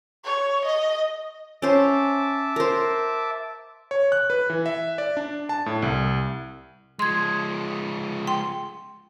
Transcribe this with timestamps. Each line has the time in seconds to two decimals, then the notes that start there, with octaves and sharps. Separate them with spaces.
0.25 C#5
0.65 D#5
1.62 C#4 C5 E5 A5 D6
2.56 A#4 C5
3.91 C#5
4.12 F#6
4.30 B4
4.50 E3
4.66 E5
4.98 D5
5.17 D4
5.49 A5
5.66 A2
5.82 C2
6.99 F3 G#3 C6 G#6
8.27 G5 C6